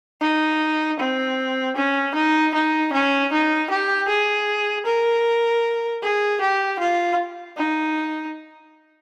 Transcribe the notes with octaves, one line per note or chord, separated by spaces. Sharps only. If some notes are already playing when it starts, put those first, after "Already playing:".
D#4
C4
C#4
D#4
D#4
C#4
D#4
G4
G#4
A#4
G#4
G4
F4
D#4